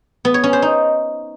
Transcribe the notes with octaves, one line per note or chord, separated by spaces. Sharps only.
B3
C#5
C#4
C5
D#4